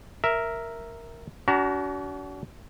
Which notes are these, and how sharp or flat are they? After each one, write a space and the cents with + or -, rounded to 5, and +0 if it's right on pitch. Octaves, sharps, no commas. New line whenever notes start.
A#4 -5 E5 +0
D4 -45 F#4 +30 A#5 +5